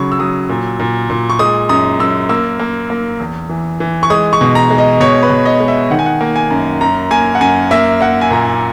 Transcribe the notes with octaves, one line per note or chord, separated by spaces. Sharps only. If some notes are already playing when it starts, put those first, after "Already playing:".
Already playing: C#3 F#3 B5 C#6
E6
F#3 D#6
A#2
A#2
A#2
C#6
G#3 D#6
F#2 D#6
F#2 E6
A#3 E6
A#3
A#3
E2
E3
E3
C#6
G#3 D#6
C#6
B2
A#5
G#3
D#5
B2 C#5
B4
B2
D#5
G#3
E5
D#3 F#5
G#5
F#5
A#3
G#5
F#2
F#2 A#5
A#3 G#5
F#5
F#2 G#5
A#3 E5
A#3 F#5
G#5
A#2 A#5